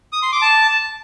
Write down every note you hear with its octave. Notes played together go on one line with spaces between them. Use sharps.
D#6
C6
D6
A5